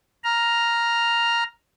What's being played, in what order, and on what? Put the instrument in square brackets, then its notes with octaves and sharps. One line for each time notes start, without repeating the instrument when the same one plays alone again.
[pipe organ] A#5 F6